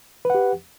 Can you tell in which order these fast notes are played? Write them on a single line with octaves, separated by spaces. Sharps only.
B4 F#5 G4